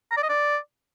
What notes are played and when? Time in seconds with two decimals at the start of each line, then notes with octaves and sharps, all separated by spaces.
0.11 A#5
0.17 D5
0.23 D#5
0.29 D5